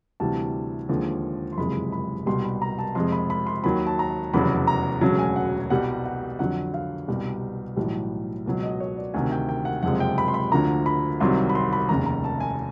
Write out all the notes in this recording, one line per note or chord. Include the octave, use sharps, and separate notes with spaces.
D2 C3 E3 G3 A5
D#2 D3 F3 G#3
C6
F#1 F2 C3 E3 G#3 B5
B5
C2 B2 G3 C6
B5
A#5
A5
F2 C3 F3 G#3 C6
B5
B5
C6
D#2 D#3 F#3 B5
A5
A#5
F1 E2 C#3 F#3 B5
A#5
E1 D2 C#3 F#3 A5
G#5
F#5
C2 B2 G3 F#5
F#5
F2 D3 F#3 F#5
F5
C2 B2 G3
B1 A2 E3 G3
C#2 B2 F#3
D#5
C#5
D5
D2 C3 D#3 G#5
G5
G5
F#5
F#1 F2 C3 F3 G#3 F#5
G5
B5
C6
B5
D2 D3 F3 A#5
B5
C2 C3 D#3 F#3 C6
B5
C6
B5
F1 D#2 C#3 A#5
A#5
A5
G#5